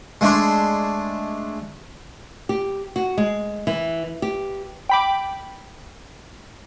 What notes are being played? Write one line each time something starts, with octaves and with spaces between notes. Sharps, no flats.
G#3 A3 D4 C6
G4
F#4
G#3
E3
G4
G5 B5 D6